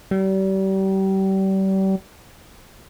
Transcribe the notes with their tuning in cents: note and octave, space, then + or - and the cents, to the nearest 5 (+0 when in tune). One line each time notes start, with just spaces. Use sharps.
G3 -35